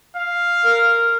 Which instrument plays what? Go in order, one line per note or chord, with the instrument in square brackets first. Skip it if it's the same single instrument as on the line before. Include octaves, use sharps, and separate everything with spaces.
[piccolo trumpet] F5
[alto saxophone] A#4